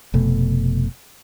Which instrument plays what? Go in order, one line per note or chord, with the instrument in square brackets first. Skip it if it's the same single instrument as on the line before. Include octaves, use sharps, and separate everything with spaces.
[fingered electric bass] F1 B2 A3